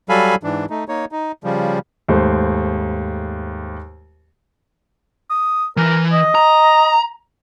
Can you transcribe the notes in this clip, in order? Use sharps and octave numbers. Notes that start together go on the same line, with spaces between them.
F#3 G3 A4 F5 G#5 B5
G#2 E3 D4
A3 D#4
A#3 D#4 C#5
D#4
C#3 F3 G3
D#2 G#2 A3 C5
D#6
E3 A#4
D#5
A#5